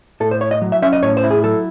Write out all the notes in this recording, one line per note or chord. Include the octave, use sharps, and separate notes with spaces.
A2 A4
C5
E4 C#5
D#5
F#3
E5
C#4 E5
D#5
A2 C#5
C5
E4
G#4
F#3 A4